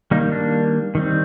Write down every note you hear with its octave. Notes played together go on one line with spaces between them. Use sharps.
D#3 G3 A#3 D#4
D4
D#3 G3 C4